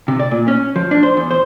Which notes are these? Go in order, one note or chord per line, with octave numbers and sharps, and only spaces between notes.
C3
D5
A#2
C#4
F3
D4
C5
E2
C5